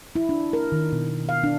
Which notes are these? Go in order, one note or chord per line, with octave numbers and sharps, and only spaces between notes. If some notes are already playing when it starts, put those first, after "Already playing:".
E4
D4
A#4
D#3
B2
F5
D4